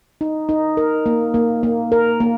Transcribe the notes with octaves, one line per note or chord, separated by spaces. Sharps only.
D#4
D#4
A#4
A#3
A#3
A#3
A#4
A#3